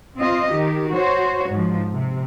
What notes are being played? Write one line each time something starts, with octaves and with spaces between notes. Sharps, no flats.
C4 F4 D#5
D#3 G4
F#4 C5 C#5
G#2 F3
C3